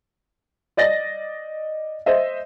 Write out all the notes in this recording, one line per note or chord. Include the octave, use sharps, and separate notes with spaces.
D5 D#5 A6 A#6
C5 D#5 E5